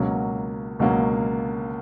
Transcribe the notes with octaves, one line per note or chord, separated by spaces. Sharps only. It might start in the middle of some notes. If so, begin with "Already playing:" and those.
Already playing: C#2 B2 F#3 A#3 C#4
C#2 B2 F#3 A#3 C#4